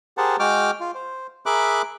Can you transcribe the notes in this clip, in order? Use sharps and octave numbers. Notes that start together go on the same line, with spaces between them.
G4 G#4 A#4 C5 F#5 A5
G#3 F#4 G5 D6 F6
F4
C5
G#4 A#4 E5 B5 D6 F#6